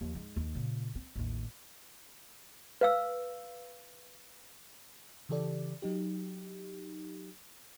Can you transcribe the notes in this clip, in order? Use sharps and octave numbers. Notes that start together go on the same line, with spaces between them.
D#2 F3
G#2
D#2
A#2 C#3
C4
A1 D#2
B4 F5 E6
C#3 E3 G4 A4 D5
F#3 D#4 G4